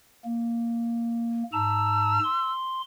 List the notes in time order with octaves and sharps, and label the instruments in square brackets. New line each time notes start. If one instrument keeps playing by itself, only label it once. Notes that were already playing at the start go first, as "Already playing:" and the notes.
[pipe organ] A#3
[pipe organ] G#2 A5 A#5 [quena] E6
[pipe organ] C6